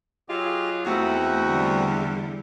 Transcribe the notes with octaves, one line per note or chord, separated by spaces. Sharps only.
F#3 F4 G4 G#4 D#5
E2 A3 C4 D#4 E4 F#4
D3 G3